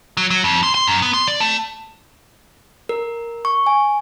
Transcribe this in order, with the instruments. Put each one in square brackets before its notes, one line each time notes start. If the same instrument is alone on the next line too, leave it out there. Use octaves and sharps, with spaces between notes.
[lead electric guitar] F#3
F#3
F2
C6
C6
F#2
B3
C6
D5
A3
[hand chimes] A#4
C#6
G#5